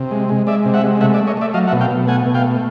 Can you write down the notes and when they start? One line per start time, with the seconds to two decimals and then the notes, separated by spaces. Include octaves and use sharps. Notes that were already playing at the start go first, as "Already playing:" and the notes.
Already playing: C3
0.11 G#3
0.29 G#3
0.47 G#3 D5 E5
0.65 C3
0.74 E5 F#5
0.83 G#3
1.01 A3 E5 F#5
1.14 D5 E5
1.18 A3
1.27 C#5 D#5
1.37 A3 D5 E5
1.54 F#3 D#5 F5
1.68 E5 F#5
1.72 B2
1.81 F5 G5
1.91 B2
2.07 A3 F#5 G#5
2.26 B2
2.34 F5 G5
2.44 A3